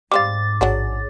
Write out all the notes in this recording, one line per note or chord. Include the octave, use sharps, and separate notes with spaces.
G#2 G3 C4 F5 D6 A6
A1 F#3 D4 F#4 G#4 C#5